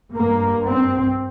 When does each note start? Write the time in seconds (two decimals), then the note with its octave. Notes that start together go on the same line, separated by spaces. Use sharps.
0.14 G2 A#3
0.67 C4